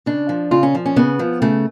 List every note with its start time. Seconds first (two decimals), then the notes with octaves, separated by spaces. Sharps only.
0.06 C#3 D4
0.29 F3
0.51 C#3 F4
0.63 C#4
0.75 F3
0.86 C#4
0.96 C#3 B3
1.19 F3
1.42 C#3 A3